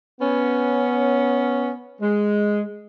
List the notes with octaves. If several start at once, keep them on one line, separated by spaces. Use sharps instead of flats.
B3 C#4
G#3